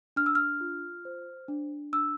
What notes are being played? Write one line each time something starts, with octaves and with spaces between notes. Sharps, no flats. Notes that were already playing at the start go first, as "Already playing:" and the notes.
D4 F6
E6
F6
F4
C5
D4
D4 E6